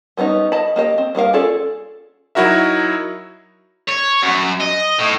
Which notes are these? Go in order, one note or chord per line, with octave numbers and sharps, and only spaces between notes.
G3 B3 C#4 D#4
D#5 A5 B5
A#3 G4 D#5
C4
G3 A#3 A#4 F5
C#4 F4 G#4 A4 D5
F#3 D#4 E4 F#4 A#4 E5
C#5
F#2
D#5
A2